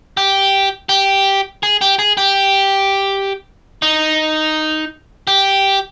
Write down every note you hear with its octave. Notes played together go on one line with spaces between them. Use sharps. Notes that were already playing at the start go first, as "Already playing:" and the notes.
G4
G4
G#4
G4
G#4
G4
D#4
G4